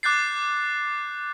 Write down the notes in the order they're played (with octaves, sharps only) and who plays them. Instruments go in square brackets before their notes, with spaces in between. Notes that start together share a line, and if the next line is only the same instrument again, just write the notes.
[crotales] D6 F#6 G6 A6 C7